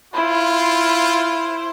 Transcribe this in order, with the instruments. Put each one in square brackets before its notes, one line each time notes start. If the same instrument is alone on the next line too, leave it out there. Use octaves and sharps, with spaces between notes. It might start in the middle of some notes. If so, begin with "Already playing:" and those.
[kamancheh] E4 C5 [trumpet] F4 [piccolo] B5